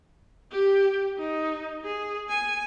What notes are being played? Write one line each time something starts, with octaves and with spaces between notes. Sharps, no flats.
G4
D#4
G#4
G#5